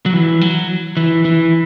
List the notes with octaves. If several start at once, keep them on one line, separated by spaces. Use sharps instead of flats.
F#3
E3
F#3
E3
E3